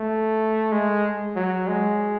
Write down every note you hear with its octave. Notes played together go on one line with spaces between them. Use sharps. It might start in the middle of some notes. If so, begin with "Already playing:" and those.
Already playing: A3
G#3
F#3
G#3